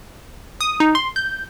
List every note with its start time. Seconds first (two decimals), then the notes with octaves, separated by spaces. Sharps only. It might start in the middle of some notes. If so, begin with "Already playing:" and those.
0.61 D#6
0.80 D#4
0.95 C6
1.16 G6